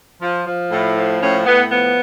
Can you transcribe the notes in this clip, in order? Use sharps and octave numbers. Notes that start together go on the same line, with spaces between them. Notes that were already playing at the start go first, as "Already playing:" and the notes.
F3
F3
A2
F3
A2 C#4
A2 B3
F3 B3